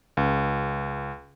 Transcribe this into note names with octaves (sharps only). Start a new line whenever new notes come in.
C#2